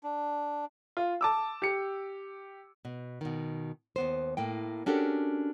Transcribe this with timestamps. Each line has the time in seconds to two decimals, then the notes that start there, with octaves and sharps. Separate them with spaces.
0.03 D4
0.97 F4
1.21 A5 D6 E6
1.62 G4 C#7
2.85 B2
3.21 B2 D#3
3.96 D#2 B3 C5
4.37 A2 A#3 G5
4.86 C#4 D4 F#4 G4 A4 A#4